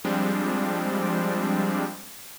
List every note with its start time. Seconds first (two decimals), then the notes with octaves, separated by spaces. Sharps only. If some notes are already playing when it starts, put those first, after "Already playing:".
0.04 F3 G3 G#3 C4 D4